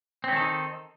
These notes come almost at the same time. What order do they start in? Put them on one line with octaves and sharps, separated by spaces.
C4 C#4 D#3 A4 D#4